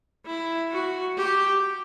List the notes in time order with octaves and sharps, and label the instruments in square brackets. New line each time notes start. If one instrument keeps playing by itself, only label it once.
[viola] E4
F#4
G4